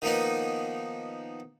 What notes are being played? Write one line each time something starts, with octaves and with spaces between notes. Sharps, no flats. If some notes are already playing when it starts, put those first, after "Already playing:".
D#3 F3 A#3 B3 D#4